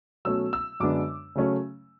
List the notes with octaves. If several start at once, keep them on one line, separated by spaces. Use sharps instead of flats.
B2 F#3 A3 C#4 E6
E6
F#2 D3 G#3 B3 D4 D6
C#3 F#3 A3 C#4